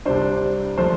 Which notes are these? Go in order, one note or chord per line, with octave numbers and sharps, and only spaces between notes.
C2 C3 G3 D4 C5
F3 A3 C5